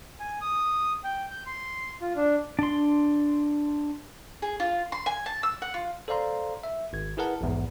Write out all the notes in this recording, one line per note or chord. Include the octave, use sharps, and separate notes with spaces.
G#5
D#6
G5
G6
C6
F4
D4
D4 C6
G#4
F4
C6
G#5
A5
E6
F#5
F4
A4 C5 D5 F5 A#5 C6
E5
G#1 G#6
E4 G#4 A#4 B4 F#5 A5
A#1 E2 G#2